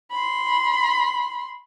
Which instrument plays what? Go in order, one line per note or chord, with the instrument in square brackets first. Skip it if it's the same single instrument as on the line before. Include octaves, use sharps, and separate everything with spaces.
[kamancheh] B5 C6